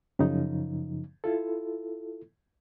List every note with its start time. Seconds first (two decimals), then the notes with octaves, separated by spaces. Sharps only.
0.19 F#2 C#3 F3 D#4
1.24 E4 F4 A4